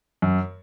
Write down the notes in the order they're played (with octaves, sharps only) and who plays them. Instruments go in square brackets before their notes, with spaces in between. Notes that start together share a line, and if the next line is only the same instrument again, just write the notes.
[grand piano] F#2